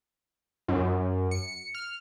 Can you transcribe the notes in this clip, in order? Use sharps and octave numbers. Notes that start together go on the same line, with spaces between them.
F#2
C#7
F6